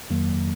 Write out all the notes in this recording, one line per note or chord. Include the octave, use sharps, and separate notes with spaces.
F2 D#3 F#3 A#3